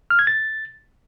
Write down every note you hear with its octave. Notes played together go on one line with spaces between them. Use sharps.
F6
G#6
A6